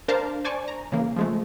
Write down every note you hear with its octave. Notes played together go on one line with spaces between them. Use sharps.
D4 A#4 C5 F5 A5 A#5
C5 D5 G#5 A5 C#6
A#5
C#3 E3 A#3
F3 G#3 A3